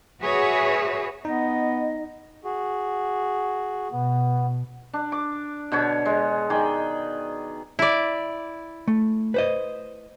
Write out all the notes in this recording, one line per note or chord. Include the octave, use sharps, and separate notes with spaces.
F#4 G#4 B4 C#5 E5
B3 D#4 D#5
F#4 G#4
B2 B3
D4
D6
B2 D3 C#5
G#3
D#3 G#4 D5 G5
E4 D5
A3
B4 C5 D#5